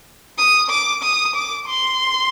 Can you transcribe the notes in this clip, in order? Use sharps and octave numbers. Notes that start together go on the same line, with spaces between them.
D#6
D6
D#6
D6
C6